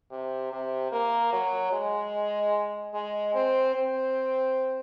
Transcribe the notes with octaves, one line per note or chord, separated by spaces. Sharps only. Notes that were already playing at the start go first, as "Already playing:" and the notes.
C3
C3
A#3
F#3
G#3
G#3
C4
C4